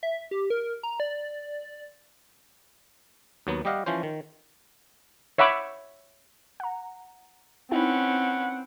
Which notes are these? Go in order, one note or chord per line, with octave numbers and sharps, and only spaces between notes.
E5
G4
A#4
A#5
D5
D#2 F#3 B3
G3 G4 D#5 F5 F#5
E3 F3 C#4 C5
D#3
C#5 E5 F#5 B5 D6
F#5 A#5
C4 C#4 D#4 E4 B4 F#5 G5